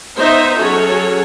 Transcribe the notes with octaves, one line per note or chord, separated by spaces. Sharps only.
B3 D#4 C5 E5
F#3 C#4 F#4 G#4 A4 C#5